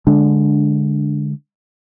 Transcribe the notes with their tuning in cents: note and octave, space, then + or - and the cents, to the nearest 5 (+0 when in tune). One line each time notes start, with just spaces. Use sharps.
D3 -15 G#3 +0 D4 +0